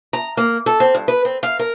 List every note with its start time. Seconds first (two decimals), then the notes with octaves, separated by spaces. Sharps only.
0.13 A#5
0.37 A#3
0.66 A4
0.80 C4
0.95 G2
1.08 B4
1.25 C4
1.43 F5
1.59 A#4